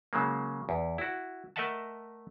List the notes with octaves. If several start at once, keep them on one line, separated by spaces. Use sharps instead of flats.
C#3 F#3 G#3 A#3
E2
E4 F#4
A3 A#4 D#5 E5 F#5 A5